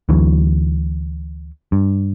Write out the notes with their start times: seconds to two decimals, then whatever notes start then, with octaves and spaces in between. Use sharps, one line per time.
0.09 D2 D3 E3 F#3
1.72 G2